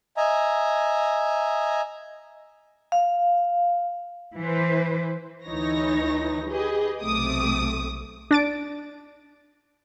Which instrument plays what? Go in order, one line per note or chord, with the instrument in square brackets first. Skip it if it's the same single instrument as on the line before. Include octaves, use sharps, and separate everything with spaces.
[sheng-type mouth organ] D#5 E5 G#5 A#5
[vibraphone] F5
[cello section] E3 B4 C5
[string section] D2 E3 D#4 C#5 A#6
G4 G#4 B4 D#5
B1 C3 A3 D6 D#6
[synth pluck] D4 A6 D7